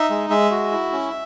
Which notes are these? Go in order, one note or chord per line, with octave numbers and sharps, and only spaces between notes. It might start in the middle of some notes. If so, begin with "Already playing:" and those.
Already playing: D#4 E5
G#3
G#3 E5
F#4
E4
C#4